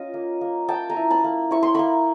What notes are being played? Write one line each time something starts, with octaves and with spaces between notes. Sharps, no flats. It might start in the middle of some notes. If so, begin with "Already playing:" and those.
Already playing: C#4 F4 D#5
A#3
A#3
A#3 G5 A5
G#5 A#5
E4
A5 B5
A#3
E4 C#6
C6
A#3 B5 C#6